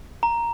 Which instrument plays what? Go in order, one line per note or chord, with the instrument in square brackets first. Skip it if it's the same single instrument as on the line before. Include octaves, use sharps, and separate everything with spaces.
[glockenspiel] A#5